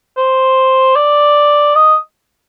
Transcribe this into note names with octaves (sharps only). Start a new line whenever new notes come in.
C5
D5
D#5